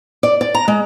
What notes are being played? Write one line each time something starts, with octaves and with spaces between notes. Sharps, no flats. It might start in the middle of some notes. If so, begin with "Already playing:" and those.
D5
D5
A#5
G#3